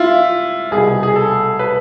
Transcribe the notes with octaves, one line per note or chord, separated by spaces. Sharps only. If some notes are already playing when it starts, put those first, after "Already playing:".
Already playing: E4 F4
C2 B2 G#4
G#4
A4
B4